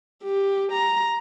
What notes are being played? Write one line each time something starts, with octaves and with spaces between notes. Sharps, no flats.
G4
A#5